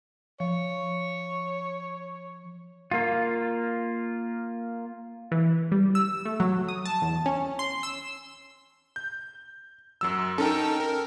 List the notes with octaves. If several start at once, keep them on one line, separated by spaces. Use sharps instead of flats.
F3 C#5
A#3 F4
E3
G3
E6
A3
F#3
D#6
A5
E2
C#4
C6
E6
G6
F#2 F#3 E6
C#4 D#4 A4 A#4 G5
A#4